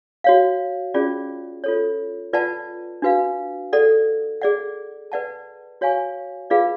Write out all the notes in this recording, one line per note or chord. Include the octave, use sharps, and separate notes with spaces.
F#4 C#5 F5
C#4 F4 G#4 D5
F4 A4 C#5
F4 B4 D5 F#5 A5
D4 F#4 B4 F5
A4 D5 F#5
G#4 D5 F#5
B4 D5 F#5 A5
F#4 C#5 F5 G#5 C#6
F4 G#4 B4 D5 F5